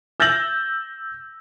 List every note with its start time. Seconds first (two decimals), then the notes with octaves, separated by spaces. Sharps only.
0.20 E6 G6 A6 A#6 F#7